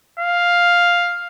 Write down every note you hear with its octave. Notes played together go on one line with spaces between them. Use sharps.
F5